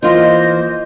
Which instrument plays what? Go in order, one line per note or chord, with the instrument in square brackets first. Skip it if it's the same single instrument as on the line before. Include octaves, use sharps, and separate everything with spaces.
[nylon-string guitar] E3 A#3 F4 [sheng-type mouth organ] C5 [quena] D#5